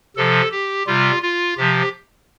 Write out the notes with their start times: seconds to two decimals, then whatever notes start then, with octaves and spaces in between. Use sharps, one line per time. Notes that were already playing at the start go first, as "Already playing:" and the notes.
0.17 C3 F3 A4
0.51 G4
0.87 C3 G3 F4
1.22 F4
1.57 C3 F3 G4